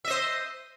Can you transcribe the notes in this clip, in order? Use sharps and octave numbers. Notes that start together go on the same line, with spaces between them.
C5 D#5 E5